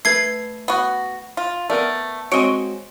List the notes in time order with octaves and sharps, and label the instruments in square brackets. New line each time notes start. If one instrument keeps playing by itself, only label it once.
[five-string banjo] A3 B4 [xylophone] G#6 C7
[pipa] B3 F#4
F4
[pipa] A3 [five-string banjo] B3 A#4 D5
[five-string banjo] G#3 C4 F#4 [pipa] C#5 D#5 [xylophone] D7